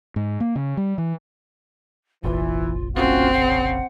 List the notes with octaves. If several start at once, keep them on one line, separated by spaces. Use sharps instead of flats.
G#2
A#3
C#3
G3
E3
F1 A#1 E3 F4
A2 C4 C#4 F4 F#4
C#3 F#5